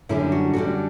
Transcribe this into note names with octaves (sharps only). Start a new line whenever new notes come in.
F#2 D3 G3 E4
F#4
F#2 D3 G3 F#4